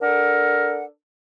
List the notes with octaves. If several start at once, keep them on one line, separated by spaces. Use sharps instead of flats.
D4 A4 A#4 F#5